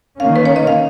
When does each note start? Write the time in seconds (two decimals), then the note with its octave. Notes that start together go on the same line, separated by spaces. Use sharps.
0.20 D#3 A#3 C#4 F5
0.36 B4
0.45 C#5
0.56 D#5
0.67 F5